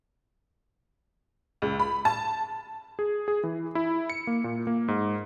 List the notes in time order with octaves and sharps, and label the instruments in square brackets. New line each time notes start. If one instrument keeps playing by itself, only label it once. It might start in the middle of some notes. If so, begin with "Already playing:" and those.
[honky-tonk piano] C#2
B5
A5
[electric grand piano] G#4
G#4
E3
E4
C#7
A#3
A#2
A#3
G#2